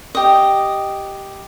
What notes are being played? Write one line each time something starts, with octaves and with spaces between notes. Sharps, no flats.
G4 D#5